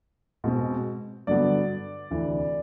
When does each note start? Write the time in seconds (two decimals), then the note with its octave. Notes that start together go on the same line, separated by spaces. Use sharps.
0.44 B2 G#3 C4
1.27 G2 D3 F#3 B3 D5
2.11 D2 C3 E3